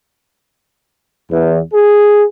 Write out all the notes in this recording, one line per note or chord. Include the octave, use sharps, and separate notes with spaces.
E2
G#4